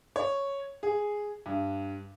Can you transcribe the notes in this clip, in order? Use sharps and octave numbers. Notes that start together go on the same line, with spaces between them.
C#5
G#4
G2